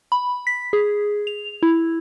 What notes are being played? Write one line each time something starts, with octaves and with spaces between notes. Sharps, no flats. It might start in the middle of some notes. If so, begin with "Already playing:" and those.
B5
B6
G#4
F7
E4